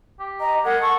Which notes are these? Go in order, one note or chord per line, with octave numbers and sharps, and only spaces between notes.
G4
D#5 A#5
G#3 A#4 F#5
A4 C#6